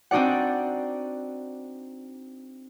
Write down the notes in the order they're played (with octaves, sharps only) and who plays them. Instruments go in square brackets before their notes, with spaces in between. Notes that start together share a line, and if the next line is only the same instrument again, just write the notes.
[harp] C4 D4 D#4 F#4 D5 F#5